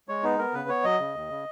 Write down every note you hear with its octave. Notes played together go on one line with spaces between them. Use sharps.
G#3 C#5
B3 D#4
B3 A#4
C#3 B4
B3 C#5
F#3 D#5
C#3
D#2
C#3